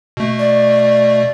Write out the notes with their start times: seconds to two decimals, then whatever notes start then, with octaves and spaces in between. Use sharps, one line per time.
0.17 B2 A3
0.39 D5